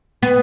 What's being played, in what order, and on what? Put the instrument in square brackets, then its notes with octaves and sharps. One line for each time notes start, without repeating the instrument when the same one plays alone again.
[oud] B3